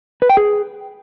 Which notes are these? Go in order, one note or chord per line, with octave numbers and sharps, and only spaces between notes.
B4
G5
G#4